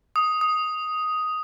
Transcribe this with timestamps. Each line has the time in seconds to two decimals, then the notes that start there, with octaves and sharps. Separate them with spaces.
0.16 D#6
0.41 D#6